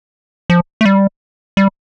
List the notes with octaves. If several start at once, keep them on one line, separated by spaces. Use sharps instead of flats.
F3
A3
G3
G3